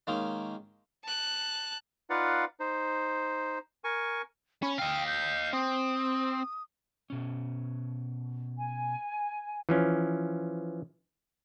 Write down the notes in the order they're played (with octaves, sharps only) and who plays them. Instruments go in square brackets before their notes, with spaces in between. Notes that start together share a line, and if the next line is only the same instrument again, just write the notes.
[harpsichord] D#3 G#3 A#3 C#4 D#4
[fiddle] A5 F#6
[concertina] D#4 F4 B4 D5 F5 F#5
D#4 C5
A#4 G#5 C#6
[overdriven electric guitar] C#4 [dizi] B5
[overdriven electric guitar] D#5 F5 [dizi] G5
[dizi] G6
[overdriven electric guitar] C4 [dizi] D#6
[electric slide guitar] B2 C#4
[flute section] G#5
[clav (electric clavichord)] E3 F3 C#4